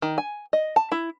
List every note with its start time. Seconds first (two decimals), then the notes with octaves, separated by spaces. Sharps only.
0.02 D#3
0.18 G#5
0.53 D#5
0.76 A5
0.92 E4